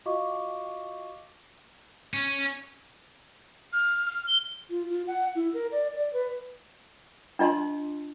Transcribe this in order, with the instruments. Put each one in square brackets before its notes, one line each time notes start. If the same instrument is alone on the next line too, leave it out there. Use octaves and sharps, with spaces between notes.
[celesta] F4 F#4 D#5 F5 C#6 D6
[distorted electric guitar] C#4
[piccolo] F6
F6
G7
[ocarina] F4
F4
F#5
E4
A#4
D5
D5
B4
[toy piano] D4 F4 D#5 A5 C6